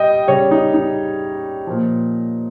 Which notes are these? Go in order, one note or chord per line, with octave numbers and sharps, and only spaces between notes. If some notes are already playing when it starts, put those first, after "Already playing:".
Already playing: G3 D#5 G5
C#3 G3 C#5
D#4
D#4
A#2 F3